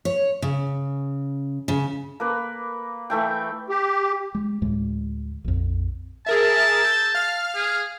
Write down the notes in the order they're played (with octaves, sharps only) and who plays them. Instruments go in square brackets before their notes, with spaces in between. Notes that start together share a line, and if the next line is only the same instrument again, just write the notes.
[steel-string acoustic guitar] C#5
C#3
C#3
[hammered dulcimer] A#3 B4
E3 A3 G5
[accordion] G4
[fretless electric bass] G#3
D2 A2 G#3
A#1 F2
[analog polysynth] G#4 A#4 E5 [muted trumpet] A5
[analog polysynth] E6 G6
F5 F6
[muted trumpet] G#4